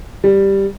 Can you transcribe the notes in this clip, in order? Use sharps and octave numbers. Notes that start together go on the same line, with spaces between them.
G3